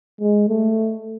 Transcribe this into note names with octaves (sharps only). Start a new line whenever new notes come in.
G#3
A3